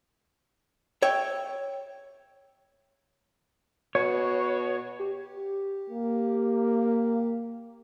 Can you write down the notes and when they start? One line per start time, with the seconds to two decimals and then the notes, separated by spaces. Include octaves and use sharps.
1.02 C#5 E5 G5
3.95 B2 C#5
4.99 G4
5.90 A#3